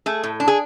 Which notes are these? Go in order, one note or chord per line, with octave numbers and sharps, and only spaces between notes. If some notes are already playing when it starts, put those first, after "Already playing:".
A3 G#4
A2
D4
G#4